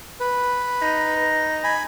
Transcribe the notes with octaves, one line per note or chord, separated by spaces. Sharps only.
B4
D#4
G#5 B5